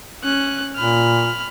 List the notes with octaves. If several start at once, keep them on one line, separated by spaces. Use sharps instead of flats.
C#4 F#6
A#2 B5 F6